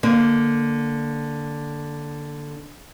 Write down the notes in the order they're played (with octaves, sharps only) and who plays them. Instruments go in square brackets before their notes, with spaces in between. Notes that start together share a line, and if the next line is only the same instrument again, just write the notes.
[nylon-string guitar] D3 A#3